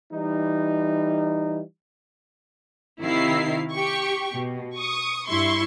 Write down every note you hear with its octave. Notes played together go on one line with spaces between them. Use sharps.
E3 G3 D#4
C3 D#3 E4 F5 C7
G4 C#6
B2
C#6 D#6
G2 E4 C6 C#6